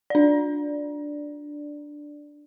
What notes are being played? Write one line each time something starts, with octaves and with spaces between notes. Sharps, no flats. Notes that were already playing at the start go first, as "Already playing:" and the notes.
D4 D5